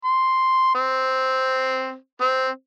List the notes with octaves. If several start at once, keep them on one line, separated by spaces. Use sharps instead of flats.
C6
C4
C4